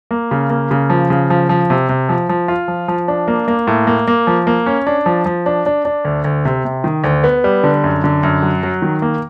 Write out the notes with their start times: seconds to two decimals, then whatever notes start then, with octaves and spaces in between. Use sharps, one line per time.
0.11 A#3
0.31 C#3
0.50 A#3
0.71 C#3
0.90 F3
1.10 C#3
1.30 F3
1.49 F3
1.70 C3
1.89 C3
2.09 F3
2.29 F3
2.48 F4
2.68 F3
2.88 F3
3.08 D4
3.28 A#3
3.48 A#3
3.67 A2
3.87 A#3
4.07 A#3
4.27 F3
4.47 A#3
4.66 C#4
4.87 D4
5.06 F3
5.26 F3
5.46 D4
5.66 D4
5.85 D4
6.05 D2
6.24 D2
6.45 C3
6.65 C3
6.84 D#3
7.04 D2
7.24 B3
7.44 G3
7.64 D3
7.84 F#2
8.04 D3
8.23 F#2
8.42 F#3
8.63 F#3
8.82 D#3
9.02 A#3